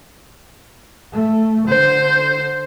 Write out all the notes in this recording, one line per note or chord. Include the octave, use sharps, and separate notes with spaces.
A3
D3 C5